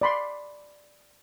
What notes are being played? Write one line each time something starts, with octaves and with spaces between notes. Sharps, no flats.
D5 B5 C6